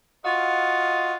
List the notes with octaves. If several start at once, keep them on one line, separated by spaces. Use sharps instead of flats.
F4 F#4 D#5 F5